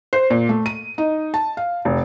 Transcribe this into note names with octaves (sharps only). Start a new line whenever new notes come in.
C5
A#2
A3
D#7
D#4
A5
F5
F1